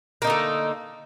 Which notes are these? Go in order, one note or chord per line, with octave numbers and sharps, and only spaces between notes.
D3 A3 A#3 D#4